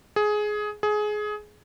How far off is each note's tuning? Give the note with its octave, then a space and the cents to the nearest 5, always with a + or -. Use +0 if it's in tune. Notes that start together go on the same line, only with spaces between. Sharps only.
G#4 +15
G#4 +20